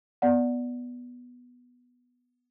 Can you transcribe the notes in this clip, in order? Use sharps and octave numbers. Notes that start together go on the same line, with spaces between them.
B3 D5 F#5